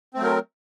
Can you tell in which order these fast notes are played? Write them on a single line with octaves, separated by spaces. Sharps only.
C4 A3 F#3 A#4